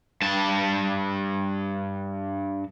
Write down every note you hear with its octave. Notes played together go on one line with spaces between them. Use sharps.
G2 A5